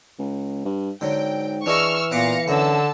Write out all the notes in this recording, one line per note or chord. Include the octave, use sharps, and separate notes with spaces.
C#2
G2
G#2 D3 F#3 G5
E3 D4 G#4 D#5 C#6 E6 F6
A#2 B3 B4 F5 D6 A#6 C#7
F#2 D3 A5 A#5 E6